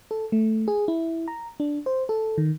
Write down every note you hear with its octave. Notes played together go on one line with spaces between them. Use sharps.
A4
A3
G#4
E4
A#5
D4
C5
A4
D#3